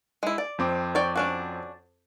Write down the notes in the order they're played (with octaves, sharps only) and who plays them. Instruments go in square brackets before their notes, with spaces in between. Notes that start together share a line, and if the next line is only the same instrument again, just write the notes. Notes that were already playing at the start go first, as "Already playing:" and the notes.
[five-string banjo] G#3 E4
D5
[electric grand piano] F2 C4 D6
[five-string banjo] C#5 D5 G5
C#4 D4 F#4